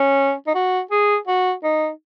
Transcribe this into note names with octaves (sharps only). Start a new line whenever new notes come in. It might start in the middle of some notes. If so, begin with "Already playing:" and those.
Already playing: C#4
D#4
F#4
G#4
F#4
D#4